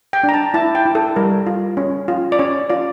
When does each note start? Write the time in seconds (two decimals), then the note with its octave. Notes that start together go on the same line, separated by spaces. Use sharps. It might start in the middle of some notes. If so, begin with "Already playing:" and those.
0.13 G5
0.24 D4
0.29 A#5
0.34 A5
0.54 E4 A5
0.75 G5
0.85 E4
0.95 A4
1.16 G3 A#4
1.47 F4
1.77 C#4
2.08 F4
2.32 D5
2.39 C#4 C#5
2.70 F4 D5